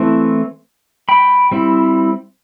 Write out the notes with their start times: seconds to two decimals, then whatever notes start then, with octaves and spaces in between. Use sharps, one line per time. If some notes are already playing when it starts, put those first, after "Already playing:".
Already playing: E3 A3 C4 E4
1.09 G5 B5
1.51 G3 C4 E4